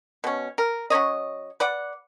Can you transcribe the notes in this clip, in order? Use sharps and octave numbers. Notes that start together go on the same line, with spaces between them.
B2 C#4
A#4
F#3 C#4 C#5 D#5
B4 D5 F#5